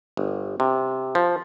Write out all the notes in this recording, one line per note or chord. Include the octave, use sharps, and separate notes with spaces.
G1
C3
F3